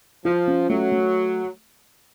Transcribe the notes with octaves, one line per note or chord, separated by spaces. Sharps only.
F3 F4
C#4
F#3 A3
A3